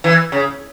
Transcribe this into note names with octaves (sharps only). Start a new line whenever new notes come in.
E3
C#3